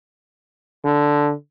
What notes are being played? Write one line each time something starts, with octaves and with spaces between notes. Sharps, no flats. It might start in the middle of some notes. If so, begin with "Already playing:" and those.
D3